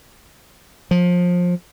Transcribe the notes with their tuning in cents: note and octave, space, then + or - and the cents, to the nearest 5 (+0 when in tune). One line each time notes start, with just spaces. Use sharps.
F3 +25